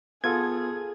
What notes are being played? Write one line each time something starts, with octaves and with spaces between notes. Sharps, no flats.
B3 F4 G#4 A4 G#6